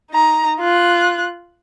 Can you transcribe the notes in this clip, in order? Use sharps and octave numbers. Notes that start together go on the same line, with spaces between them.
D#4 A#5
F4 F#6